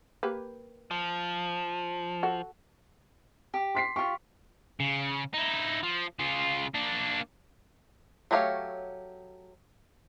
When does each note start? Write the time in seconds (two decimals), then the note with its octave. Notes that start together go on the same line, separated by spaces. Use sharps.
0.23 A#3 G4 B4
0.91 F3
2.23 F#4 A4
3.54 G4
3.75 C6 B6 C7
3.96 F4 G4 C#6
4.80 C#3
5.34 D#4 E4
5.83 F3
6.19 C#3 F4
6.75 A#3 D4
8.31 F#3 A3 G4 C#5 F5